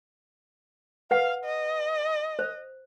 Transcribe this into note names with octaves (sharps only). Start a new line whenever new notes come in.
B4 F5 F#5
D#5
C5